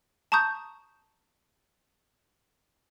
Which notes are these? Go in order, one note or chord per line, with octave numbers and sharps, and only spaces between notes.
A5 A#5 C#6 D#6 G6